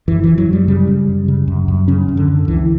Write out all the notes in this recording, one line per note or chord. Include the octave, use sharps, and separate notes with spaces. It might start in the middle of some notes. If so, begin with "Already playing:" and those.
F#2 E3
F#2 E3
F#3
F#2 G3
C#3 G3
C#3
F#2
C#3
F#2
F#2
C#3 C#4
F#2
D3
F#2
C#2 E3